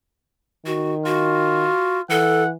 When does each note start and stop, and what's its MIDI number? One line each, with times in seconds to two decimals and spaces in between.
0.66 1.69 51
0.66 0.94 66
1.06 2.01 65
1.06 2.01 66
2.10 2.55 52
2.10 2.43 69
2.10 2.49 78